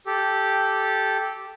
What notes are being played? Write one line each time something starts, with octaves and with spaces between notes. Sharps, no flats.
G4 A4